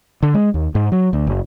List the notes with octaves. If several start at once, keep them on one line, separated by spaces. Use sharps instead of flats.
D3
G#3
D#2
G#2
F#3
D2
F#1